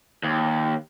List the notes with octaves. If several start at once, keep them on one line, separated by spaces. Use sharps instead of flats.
D#2